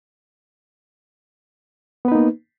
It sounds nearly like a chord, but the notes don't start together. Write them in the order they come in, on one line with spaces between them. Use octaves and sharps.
B3 B4 D#4 A#3